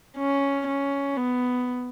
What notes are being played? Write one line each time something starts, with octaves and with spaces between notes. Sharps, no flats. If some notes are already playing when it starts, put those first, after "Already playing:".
C#4
C#4
B3